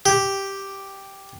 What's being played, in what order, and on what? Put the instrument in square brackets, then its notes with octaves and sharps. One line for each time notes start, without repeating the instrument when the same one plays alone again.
[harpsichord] G4